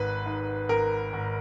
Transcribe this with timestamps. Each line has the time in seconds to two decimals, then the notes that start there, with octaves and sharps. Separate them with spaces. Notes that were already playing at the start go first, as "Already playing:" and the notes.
Already playing: G#1 G#2 B4
0.26 G#2
0.69 G#1 A#4
1.13 G#1